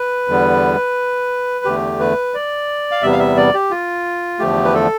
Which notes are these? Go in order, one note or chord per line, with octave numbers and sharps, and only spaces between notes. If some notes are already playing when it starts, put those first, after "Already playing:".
Already playing: B4
E2 D3 G3 B3
E2 D3 A3 G4
B4
D5
F5
E2 C3 G3 B3 E5
F5
E5
D5
G4
F4
E2 D3 F3 A3 G4
B4
A4